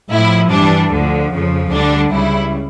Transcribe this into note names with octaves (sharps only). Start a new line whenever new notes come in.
A2 F3 E4
G2 E3 G3 D4
D2 D3 F3
F2 C#3 F3
D2 D3 G3 D4
C#2 C#3 G3 E4